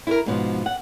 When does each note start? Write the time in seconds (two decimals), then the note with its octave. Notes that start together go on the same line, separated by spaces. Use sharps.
0.07 E4 A4 A#4
0.26 G#2 B2 F3
0.66 F#5